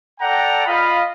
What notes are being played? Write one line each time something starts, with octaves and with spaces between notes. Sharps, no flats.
A4 D5 F#5 G5 A#5
F4 D#5 F5 B5